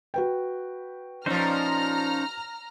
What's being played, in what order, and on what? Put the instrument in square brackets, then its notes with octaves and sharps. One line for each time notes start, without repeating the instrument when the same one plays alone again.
[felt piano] F#4 B4 G5
[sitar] A#2 F3 [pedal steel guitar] C#4 D#4 C5 [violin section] A#5 F6